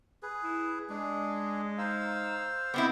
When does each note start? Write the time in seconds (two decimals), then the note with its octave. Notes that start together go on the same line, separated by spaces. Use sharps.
0.23 G#4 B4
0.43 E4
0.89 G#3 D4 G#4
1.78 D#4 C5 F5 E6
2.74 B3 C4 E4 D#5 D6